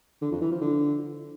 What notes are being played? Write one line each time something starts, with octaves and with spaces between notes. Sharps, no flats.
D3
F2
E3
F3
D3